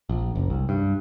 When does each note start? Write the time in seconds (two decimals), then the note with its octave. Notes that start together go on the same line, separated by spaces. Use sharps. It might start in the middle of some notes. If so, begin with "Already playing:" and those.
0.09 A#1
0.35 F#1
0.50 C2
0.69 G2